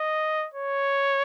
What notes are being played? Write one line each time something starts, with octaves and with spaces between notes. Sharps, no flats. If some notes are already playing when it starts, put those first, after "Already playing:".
Already playing: D#5
C#5